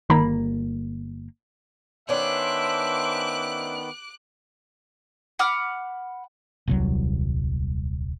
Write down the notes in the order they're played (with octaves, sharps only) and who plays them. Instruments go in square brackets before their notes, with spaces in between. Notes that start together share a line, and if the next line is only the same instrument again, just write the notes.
[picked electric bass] G1 A#3 [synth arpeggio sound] D#3 A#5 B5
[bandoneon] D#3 B3 [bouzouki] C#4 D4 [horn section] C5 E5 [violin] D6 F#6
[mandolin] F#5 B5 D6 F6
[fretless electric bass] D#1 C2 F#3